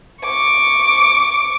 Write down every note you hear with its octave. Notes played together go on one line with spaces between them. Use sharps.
C#6 D6